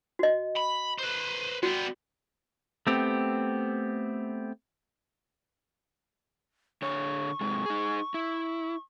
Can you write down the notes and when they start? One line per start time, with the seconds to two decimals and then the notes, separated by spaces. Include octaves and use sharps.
0.19 F#4 D#5
0.57 B5
0.99 B4 C5
1.63 G3 B3 F#4
2.87 A3 B3 C4 G4
6.82 D3 C#5 C#6
7.41 G#2 C3 G#3
7.66 D#4 G#4
8.14 E4